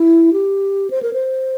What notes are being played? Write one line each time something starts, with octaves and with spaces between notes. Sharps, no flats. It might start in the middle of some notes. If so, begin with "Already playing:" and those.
Already playing: E4
G4
C5
A#4
C5